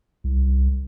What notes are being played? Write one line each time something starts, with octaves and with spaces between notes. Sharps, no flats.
C2